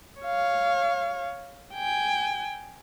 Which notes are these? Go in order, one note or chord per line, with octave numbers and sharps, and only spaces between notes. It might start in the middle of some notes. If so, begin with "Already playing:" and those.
C#5 F5
G5 G#5